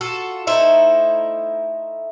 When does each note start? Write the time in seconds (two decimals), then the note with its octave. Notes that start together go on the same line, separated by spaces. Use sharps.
0.01 F4 F#4 A4
0.47 A3 D#4 E4 C5